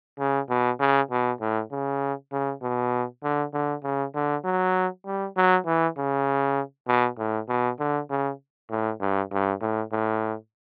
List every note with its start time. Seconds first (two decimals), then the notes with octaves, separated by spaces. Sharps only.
0.19 C#3
0.49 B2
0.80 C#3
1.11 B2
1.41 A2
1.71 C#3
2.32 C#3
2.62 B2
3.23 D3
3.53 D3
3.83 C#3
4.15 D3
4.44 F#3
5.06 G3
5.36 F#3
5.66 E3
5.97 C#3
6.87 B2
7.18 A2
7.49 B2
7.79 D3
8.10 C#3
8.70 A2
9.00 G2
9.32 G2
9.61 A2
9.92 A2